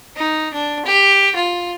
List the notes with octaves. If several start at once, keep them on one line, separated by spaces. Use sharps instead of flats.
D#4
D4
G4
F4